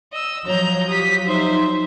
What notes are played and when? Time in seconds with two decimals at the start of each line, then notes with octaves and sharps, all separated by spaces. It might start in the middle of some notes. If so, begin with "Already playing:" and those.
0.13 D#5 E6
0.47 F3 F#3 C#5 A#5 G6
0.88 G4 D#6 B6
1.26 D#4 C5 E5